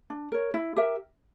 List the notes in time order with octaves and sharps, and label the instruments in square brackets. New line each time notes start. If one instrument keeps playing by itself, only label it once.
[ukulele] D4
A#4 C#5
E4
G4 A#4 E5